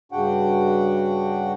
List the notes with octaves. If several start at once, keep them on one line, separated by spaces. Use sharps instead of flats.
G2 C#3 D4 F#4 F#5 G5